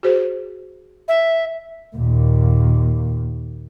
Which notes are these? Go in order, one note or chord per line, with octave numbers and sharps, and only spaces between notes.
F#4 G#4 C5
E5
D#2 A#2